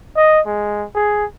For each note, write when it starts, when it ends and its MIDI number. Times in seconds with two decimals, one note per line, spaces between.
0.17 0.40 75
0.46 0.86 56
0.95 1.25 68